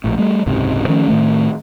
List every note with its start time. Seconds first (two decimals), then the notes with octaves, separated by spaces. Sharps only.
0.04 A#1 A2
0.18 G3 A3
0.46 F#1 C#2 G#2 C3
0.88 D#3 F3 A3 C#4
1.08 A2 D#3 A3